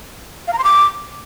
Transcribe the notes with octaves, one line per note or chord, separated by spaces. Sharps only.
F5
A#5
C6
D6